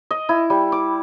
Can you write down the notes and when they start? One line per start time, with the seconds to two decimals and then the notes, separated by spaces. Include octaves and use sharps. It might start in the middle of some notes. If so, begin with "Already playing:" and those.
0.11 D#5
0.29 E4
0.50 G3
0.72 D6